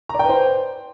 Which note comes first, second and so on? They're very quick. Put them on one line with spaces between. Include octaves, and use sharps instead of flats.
A#5 D5 G5 B4 C5